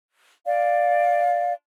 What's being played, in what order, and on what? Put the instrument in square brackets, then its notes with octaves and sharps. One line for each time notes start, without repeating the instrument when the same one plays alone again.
[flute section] D5 F5